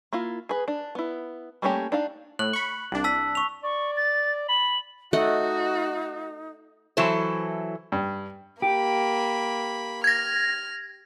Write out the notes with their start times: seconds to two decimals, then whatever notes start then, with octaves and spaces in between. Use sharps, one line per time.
0.13 A#3 E4 F4
0.49 G#4 B4
0.68 D4
0.95 B3 E4
1.62 G3 A3 A#3 C#4 G4
1.92 D4 D#4 F5
2.39 A2 F#6 F#7
2.53 B5 C#6
2.92 C2 D4
3.04 A5 E6 B6
3.35 C#6 F7
3.63 D5 C#6
3.96 A6
4.49 B5 F#7
5.13 A3 D#4 F#4 D#5 F#5
6.97 E3 F#3 E4 A4 C5
7.92 G2
8.62 A#3 G4 B5
10.04 F6 G#6 A#6